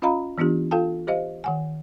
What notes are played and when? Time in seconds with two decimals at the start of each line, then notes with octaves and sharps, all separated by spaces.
0.02 C#4 F4 D#5 F5 A#5 B5
0.38 E3 B3 D4 F4 G4
0.71 F4 A4 F5 G5 A5
1.07 G4 C5 D#5 F5
1.44 D#3 F#5 G#5